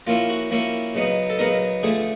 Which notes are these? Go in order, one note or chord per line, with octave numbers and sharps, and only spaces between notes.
F3 A#3 C#4 E4 F4
F#4
F3 A#3 C#4 E4
C#3 F#3 B3 D#4
A4
C#3 F#3 B3 D#4 A#4
D3 F3 A3 G#4